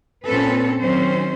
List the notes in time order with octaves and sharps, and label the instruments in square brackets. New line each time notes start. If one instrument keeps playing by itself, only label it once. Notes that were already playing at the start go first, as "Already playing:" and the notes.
[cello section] A#2 C4 C#4 A4 B4
D#3 F#3 C4 C#4 C5